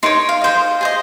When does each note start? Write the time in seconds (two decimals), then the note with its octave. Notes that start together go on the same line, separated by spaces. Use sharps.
0.03 D#4 A#4 C#5 C6
0.29 F5
0.42 G#4 C5 D#5
0.81 G#4 C5 D#5